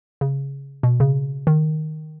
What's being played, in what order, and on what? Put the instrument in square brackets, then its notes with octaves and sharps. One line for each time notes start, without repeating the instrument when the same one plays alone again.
[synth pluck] C#3
B2
C#3
D#3